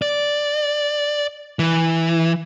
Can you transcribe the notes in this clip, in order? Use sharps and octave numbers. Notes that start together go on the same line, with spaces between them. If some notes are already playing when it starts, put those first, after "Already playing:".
D5
E3